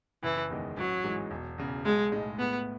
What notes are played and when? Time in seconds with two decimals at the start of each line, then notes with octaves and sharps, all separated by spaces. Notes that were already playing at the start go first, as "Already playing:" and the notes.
0.23 F#1 E3
0.50 E2 D#3 G#3
0.77 A1 F#3
1.04 G#2 E3 G#3
1.31 E1
1.58 E2 C#3
1.85 B1 G#3
2.12 A2 G#3 D#4
2.39 A2 B3